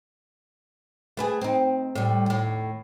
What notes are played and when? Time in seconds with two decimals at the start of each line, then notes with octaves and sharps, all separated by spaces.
1.17 A3 B3 G#4
1.41 C4 D#4
1.95 A2 G3
2.26 D#2 A2